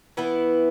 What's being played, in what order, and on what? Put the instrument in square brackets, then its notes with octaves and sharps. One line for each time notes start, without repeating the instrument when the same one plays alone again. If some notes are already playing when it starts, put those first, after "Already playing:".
[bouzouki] E3 B3 E4